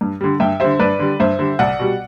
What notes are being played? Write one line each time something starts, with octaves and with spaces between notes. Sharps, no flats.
G2
D3 G3
G2 E5 G5
D3 G3 C5 E5
G2 B4 D5
D3 G3
G2 C5 E5
D3 G3
C2 D5 F#5
B2 G3